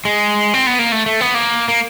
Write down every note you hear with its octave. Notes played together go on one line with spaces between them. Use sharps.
G#3
C4
B3
A#3
A3
A3
B3
A#3
A#3